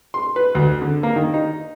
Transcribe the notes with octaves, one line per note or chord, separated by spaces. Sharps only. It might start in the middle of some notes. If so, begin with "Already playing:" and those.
C6
B4
D2
D3
A#3
D#3
D#4